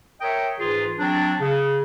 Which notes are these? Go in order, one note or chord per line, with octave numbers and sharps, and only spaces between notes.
A#4 C#5 D#5 E5 G5
G#2 E3 F4 G#4
F#3 C4 D4
C#3